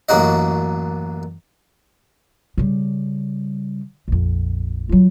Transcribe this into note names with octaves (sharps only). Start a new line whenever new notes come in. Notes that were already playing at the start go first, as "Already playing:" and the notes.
A1 F#2 A#3 F#4 D#5
C#3 G3
A#1 F2
F#3 F4